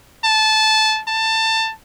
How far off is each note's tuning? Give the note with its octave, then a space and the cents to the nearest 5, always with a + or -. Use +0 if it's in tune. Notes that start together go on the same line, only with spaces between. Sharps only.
A5 -15
A5 +20